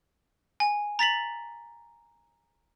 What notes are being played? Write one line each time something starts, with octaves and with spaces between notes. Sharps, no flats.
G#5
A#5 A6 B6 F#7